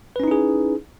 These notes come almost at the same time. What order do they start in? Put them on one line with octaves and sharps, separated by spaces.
B4 C#4 D#4 E4 G#4